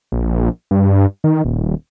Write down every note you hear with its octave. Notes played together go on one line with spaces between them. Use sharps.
A#1
G2
D#3
D#1